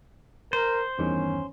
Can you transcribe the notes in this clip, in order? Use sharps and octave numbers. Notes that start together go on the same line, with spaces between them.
A#4 C5
E2 G2 D#3 C#4